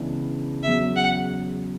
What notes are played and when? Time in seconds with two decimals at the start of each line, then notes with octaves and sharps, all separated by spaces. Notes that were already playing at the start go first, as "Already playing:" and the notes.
Already playing: C#2 C#3 E3 B3 D4
0.63 E2 C#3 F#3 E5
0.96 F#5